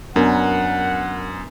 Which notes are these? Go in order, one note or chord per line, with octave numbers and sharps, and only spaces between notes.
F#2 B3 D4 A#4 F#5 G#5